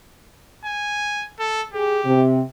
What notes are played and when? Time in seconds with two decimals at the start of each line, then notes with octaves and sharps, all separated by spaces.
0.65 G#5
1.39 A4
1.74 G4 G#4
2.05 C3